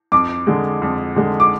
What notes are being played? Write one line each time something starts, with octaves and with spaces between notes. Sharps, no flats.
F2 D6
D3 G#3
F2
D3 G#3
D6